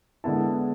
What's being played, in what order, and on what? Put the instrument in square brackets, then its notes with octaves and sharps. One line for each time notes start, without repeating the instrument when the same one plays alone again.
[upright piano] D3 G#3 B3 E4 A5